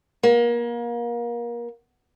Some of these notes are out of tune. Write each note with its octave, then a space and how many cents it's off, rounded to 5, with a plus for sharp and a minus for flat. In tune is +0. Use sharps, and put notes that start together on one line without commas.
A#3 +30